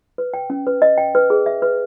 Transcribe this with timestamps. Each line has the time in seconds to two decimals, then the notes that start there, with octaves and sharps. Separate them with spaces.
0.18 B4
0.34 G5
0.50 C#4
0.67 B4
0.82 D#5
0.98 G5
1.15 B4
1.30 G#4
1.46 E5
1.62 B4